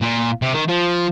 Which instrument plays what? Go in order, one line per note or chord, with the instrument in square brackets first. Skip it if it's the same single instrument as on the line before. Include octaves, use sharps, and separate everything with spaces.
[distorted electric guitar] A#2
C3
D#3
F3